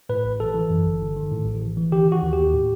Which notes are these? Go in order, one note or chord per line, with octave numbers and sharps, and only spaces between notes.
A2 B4
A1
A1 A4
E3
F#2
G1
G1
D#3
A2
A1
A1
E3
D#3 G4
D#3 F#4
D#2
G4
D#2
A2